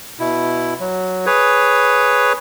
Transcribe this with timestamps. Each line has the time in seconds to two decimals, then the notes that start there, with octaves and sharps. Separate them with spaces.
0.19 B2 E4
0.80 F#3
1.26 G#4 B4 C#5